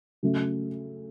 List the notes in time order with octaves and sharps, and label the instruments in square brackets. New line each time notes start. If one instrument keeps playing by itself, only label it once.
[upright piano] C#3 F#3 A3